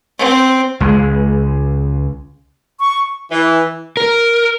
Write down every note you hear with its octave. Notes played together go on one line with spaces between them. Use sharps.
C4
C#2 G#3
C#6
E3
A#4